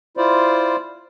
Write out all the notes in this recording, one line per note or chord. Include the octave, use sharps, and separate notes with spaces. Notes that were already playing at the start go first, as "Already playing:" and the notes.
E4 F4 C5 D5